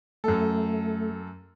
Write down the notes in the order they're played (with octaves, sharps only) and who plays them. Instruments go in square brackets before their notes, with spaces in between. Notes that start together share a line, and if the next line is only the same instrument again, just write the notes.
[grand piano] F#2 A4 [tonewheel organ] A3